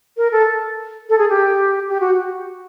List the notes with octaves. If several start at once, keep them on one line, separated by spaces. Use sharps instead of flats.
A#4
A4
A4
G#4
G4
G4
F#4